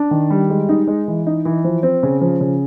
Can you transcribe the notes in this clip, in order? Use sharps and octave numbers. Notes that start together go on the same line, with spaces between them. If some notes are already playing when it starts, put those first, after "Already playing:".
Already playing: D4
D#3
G3
G#3
D#4
G#3
E3
D#4
E3
F3
C4
C#3
F3
C#3